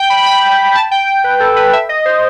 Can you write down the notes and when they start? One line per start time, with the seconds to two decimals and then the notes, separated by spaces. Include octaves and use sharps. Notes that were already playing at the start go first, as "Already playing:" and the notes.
Already playing: G5
0.10 B5
0.26 B5
0.75 A5
0.91 G5
1.24 B4
1.40 A4
1.56 B4
1.73 E5
1.89 D#5
2.05 C5